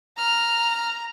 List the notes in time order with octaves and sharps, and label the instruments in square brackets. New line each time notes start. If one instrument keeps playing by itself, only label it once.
[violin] A#5 [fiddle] F6